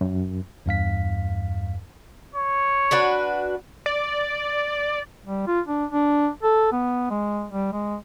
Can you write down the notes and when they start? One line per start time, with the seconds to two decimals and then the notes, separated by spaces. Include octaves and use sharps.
0.01 F#2
0.66 E2 G2 F5 B6
2.35 C#5
2.91 D4 F#4 B4
3.86 D5
5.26 G3
5.47 F4
5.67 D4
5.91 D4
6.43 A4
6.72 B3
7.10 G#3
7.52 G3
7.73 G#3